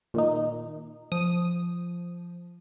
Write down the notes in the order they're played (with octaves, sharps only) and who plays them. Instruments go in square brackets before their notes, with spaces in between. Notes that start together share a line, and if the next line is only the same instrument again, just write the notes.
[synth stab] A#2 D#3 D#4
[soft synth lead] F3 [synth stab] D#6